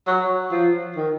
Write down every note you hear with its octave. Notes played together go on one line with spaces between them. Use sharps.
F#3
F3
D#3